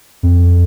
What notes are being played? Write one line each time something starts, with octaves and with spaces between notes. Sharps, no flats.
F2